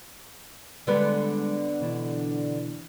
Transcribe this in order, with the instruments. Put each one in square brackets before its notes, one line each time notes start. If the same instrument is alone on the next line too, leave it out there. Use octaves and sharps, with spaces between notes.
[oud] D3 B3 B4 [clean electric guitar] G3 G#3 A4
[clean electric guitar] B2 E3 D4